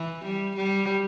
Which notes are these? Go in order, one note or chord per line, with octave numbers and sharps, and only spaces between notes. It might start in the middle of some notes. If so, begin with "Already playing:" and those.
Already playing: E3
G3
G3